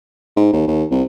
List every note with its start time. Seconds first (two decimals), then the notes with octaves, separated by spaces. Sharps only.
0.36 G#2
0.53 D#2
0.67 D#2
0.91 C2